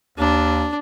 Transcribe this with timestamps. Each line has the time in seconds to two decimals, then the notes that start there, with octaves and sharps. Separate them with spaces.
0.18 D#2 D4